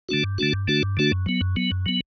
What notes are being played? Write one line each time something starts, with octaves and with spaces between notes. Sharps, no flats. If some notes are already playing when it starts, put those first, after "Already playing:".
D3 A3 D4 F#4
G2
D3 A3 D4 F#4
G2
D3 A3 D4 F#4
G2
D3 A3 D4 F#4
F#2
F#3 B3
F#2
F#3 B3
F#2
F#3 B3